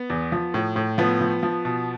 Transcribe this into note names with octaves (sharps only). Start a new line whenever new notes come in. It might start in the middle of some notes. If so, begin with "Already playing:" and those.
Already playing: B3
E2
F3
A2
A2
F3 B3
F3
F3
B2